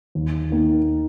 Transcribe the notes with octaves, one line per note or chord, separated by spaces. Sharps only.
D#2
D#3 A#3 D#4